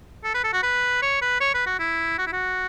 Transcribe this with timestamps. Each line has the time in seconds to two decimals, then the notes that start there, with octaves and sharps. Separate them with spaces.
0.24 A4
0.34 B4
0.44 A4
0.53 F#4
0.62 B4
1.02 C#5
1.21 B4
1.40 C#5
1.54 B4
1.66 F#4
1.79 E4
2.18 F#4
2.26 E4
2.32 F#4